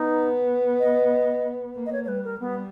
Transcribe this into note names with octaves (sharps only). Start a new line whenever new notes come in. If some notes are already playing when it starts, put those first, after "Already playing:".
Already playing: B3 D#4
D#5
A#3
D#5
C#5
C#5
G3 B4
A#4
G3 B3